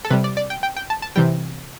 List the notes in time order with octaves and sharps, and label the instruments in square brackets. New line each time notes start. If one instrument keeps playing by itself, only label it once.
[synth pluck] A4
C3 G3 B4
D5
D5
G5
G5
G5
A5
A5
C3 E3 G3 G5